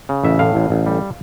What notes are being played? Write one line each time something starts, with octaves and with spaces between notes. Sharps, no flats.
C#3
A1 E5
A2 F5
A1
A1
G3